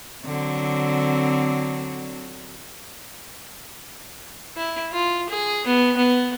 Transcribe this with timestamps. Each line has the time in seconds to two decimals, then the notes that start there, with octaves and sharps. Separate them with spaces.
0.24 D3 F#3 C4
4.57 E4
4.92 F4
5.30 G#4
5.67 B3
5.97 B3